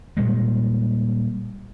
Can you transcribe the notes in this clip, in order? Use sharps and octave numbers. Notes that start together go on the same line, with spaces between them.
A#2 G3 G#3